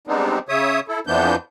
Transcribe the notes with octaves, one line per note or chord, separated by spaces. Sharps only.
G3 G#3 B3 C4 D4 D#4
C#3 C#5 E5 D#6
E4 A4
F2 E3 F3 B3 D4 G6